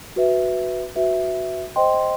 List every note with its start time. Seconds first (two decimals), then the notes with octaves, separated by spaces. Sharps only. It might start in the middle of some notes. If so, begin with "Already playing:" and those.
0.16 F#4 B4 E5
0.96 F#4 B4 E5
1.76 C5 D#5 G5 C6